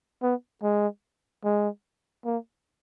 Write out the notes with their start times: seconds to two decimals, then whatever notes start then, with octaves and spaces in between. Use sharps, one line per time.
0.22 B3
0.63 G#3
1.44 G#3
2.25 A#3